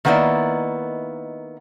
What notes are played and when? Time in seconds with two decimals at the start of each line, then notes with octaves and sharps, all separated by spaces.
0.05 D#3 A#3 B3 D#4 E4 D5